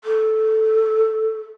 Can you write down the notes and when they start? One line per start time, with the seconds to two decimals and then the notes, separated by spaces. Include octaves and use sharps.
0.04 A4